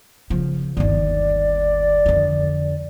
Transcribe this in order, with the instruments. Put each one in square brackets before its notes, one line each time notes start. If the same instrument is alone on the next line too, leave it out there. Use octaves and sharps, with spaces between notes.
[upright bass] C#3 F3
[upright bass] G1 D#2 [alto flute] D5
[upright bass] F2 D3